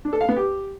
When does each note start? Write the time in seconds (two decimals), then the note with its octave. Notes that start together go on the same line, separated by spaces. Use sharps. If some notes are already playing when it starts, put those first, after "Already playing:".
0.05 D4
0.13 A4
0.21 F5
0.29 B3
0.36 G4